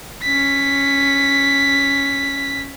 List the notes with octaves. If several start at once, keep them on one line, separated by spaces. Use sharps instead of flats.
C#4 B6